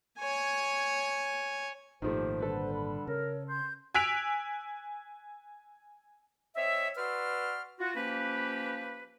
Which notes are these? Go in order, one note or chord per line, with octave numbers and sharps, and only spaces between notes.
C#5 G#5
G#1 A#2 D#3 F3 A3 G4 C5
D3 G3 D4 A4 B4
B5
C#3 A#4 C#5
C6 G6
G#5 E6 F#6 B6 D7 F7
C4 C#5 D#5 E5
F#4 B4 D5 C6 E6 F6
F4 F#4
F3 A#3 C#4 G4 B4